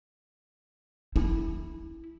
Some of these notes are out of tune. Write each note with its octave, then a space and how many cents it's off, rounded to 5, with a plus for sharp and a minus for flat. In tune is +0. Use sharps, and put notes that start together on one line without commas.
E4 -10